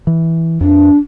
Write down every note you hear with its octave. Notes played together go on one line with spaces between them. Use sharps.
E3
F2 D4